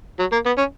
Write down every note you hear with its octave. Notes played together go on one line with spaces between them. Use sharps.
F#3
A#3
B3
C#4